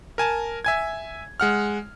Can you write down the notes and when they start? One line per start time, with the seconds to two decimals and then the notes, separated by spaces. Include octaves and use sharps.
0.18 A#4 G#5 A5
0.65 E5 G#5 G#6
1.40 G#3 F#5 F6